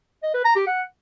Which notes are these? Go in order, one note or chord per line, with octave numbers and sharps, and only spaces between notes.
D#5
B4
A#5
G4
F#5